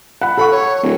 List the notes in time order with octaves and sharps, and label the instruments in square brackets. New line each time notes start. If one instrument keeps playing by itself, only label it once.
[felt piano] F#5 B5
[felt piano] A4 F#5 C#6 [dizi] B5
[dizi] C#5
[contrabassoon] D1